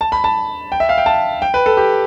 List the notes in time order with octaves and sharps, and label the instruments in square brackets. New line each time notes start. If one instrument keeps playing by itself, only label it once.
[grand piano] A5
B5
A5
G5
E5
F5
G5
A5
G5
B4
A4
G4